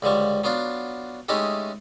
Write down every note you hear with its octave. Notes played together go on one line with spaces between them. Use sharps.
C#2 D3 F3 G3 C#6
F#3 B3 D4 F4
G#3 A3 C#4 D#4 E4 G4